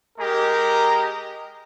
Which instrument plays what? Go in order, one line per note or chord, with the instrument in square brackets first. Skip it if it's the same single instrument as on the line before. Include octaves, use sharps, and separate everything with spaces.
[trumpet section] G#3 G4 A#4 D#5 A#5